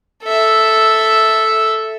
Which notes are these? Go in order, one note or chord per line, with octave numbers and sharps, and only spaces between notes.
A4 E5